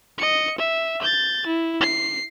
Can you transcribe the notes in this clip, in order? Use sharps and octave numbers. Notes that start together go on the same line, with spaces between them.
D#5 C#7
E5
G6 A6
E4
C7